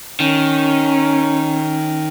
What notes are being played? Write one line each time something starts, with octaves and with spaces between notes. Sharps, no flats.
D#3 C#4